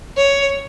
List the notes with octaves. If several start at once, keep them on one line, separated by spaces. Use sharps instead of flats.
C#5